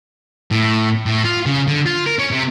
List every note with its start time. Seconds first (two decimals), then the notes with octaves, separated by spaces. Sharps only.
0.51 A2
1.06 A2
1.24 F4
1.46 C#3
1.68 D3
1.86 F4
2.06 A#4
2.19 C#4
2.32 C3